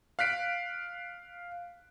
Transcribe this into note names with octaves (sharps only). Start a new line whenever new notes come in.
F5 F#6 B6 D7